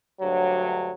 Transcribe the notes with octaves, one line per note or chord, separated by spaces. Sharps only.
D2 G2 F#3